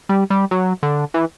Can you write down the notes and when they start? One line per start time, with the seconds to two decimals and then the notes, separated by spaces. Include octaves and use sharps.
0.09 G3
0.30 G3
0.51 F#3
0.83 D3
1.14 E3